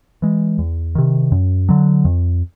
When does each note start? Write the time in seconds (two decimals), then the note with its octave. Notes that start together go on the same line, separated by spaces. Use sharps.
0.22 E3 G#3
0.59 E2
0.95 C3 D#3
1.32 F#2
1.69 D3 F#3
2.05 F2